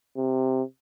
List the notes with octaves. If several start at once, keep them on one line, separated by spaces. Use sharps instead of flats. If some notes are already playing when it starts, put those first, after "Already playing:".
C3